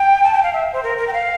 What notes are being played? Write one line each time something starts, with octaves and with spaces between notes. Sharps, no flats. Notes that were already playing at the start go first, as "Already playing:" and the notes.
Already playing: G5
A5
G5
F5
E5
C5
A#4
A#4
G5
F5